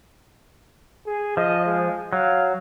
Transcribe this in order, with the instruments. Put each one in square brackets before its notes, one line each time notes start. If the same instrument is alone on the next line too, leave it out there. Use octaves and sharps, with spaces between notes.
[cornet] G#4
[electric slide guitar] F3 [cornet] D#5
[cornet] G#3
[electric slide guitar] F#3 [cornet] F5